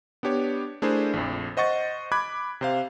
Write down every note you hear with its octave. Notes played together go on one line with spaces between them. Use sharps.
B3 D4 G4 C#5
A3 D4 E4 G#4 A#4 C5
A#1 F2
C5 D#5 F#5 C#6 A6
B5 D6 F#6 G#6
C3 C5 F5